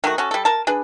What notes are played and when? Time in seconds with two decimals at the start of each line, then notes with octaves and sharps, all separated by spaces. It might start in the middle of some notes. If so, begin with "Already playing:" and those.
0.04 D#3 A3 D#4 F#4
0.18 C#4 F#4 A4
0.31 G3 A4
0.45 A#4 A5
0.67 D4 G#4 B4